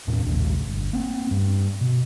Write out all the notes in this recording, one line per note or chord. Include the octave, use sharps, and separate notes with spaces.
D#2 A2 D4
A#1 D#2 C#3
G1
A#3 C4
G2
B2